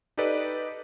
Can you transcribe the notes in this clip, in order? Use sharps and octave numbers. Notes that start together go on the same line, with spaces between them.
D#4 G4 A4 B4 D5 D#5